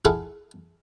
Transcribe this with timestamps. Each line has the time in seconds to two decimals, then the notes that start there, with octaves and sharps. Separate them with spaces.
0.05 E4 F4 G#4 A4 F5 F#5